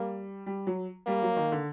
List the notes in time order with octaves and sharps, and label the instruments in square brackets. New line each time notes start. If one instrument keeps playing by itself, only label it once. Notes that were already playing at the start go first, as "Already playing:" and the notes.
Already playing: [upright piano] G3 [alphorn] A#3
[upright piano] G3
F#3
[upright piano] G3 [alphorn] A#3
[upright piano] F#3
D#3
D3